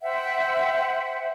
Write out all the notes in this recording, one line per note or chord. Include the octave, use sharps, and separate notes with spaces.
C5 E5 F#5 G5